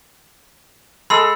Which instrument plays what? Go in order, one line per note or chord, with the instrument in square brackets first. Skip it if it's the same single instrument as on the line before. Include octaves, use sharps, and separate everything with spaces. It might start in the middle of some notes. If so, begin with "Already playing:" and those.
[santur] G#3 A4 [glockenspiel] B5 E6